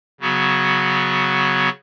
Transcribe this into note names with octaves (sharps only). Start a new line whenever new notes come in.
C#3 F#3 B3 F#4